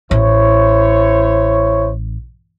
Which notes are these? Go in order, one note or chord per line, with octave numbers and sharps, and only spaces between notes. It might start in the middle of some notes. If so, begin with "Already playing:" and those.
A1 E4 C5 C#5